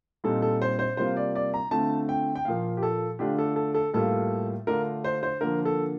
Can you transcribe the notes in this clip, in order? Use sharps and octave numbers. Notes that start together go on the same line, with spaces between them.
A#2 G3 C4 D#4 A4
A4
C5
C5
C3 G3 A#3 F4 C5
D5
D5
A#5
D3 A3 C4 F4 A5
G5
G5
A#2 F3 A#3 F5
G4
A4
D3 A3 D4 F4 G4
A4
A4
A4
A2 G3 A#3 F4 A4
D3 A3 D4 F4 A#4
C5
C5
D3 F3 A#3 A#4
A4